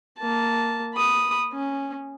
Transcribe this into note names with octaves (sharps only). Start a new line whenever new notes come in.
A#3 A5
B5 D#6
C#4